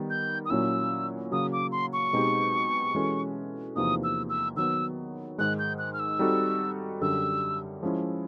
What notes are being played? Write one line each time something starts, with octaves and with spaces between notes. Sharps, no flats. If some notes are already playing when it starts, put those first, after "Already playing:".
Already playing: D#3 G3 B3
G6
D#6
A#2 F#3 A#3 C#4 E4 E6
C#3 F#3 A#3 D#6
D6
C6
C#6
B2 G#3 C4 D#4 G4
E3 G#3 C#4 F#4 A4
E2 C3 F3 A#3 D#4 D#6
E6
E6
D#3 F#3 B3 E6
G#2 D#3 G#3 F#6
G6
F#6
F6
E6
G3 C4 D#4 F#4 A4
F#2 D3 G3 E6
F3 G#3 C#4 E4